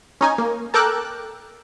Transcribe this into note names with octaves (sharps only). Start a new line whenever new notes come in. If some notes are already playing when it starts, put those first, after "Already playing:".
C#4 D#4 G#5
A#3
A4 A#4 G5 D6 E6 F#6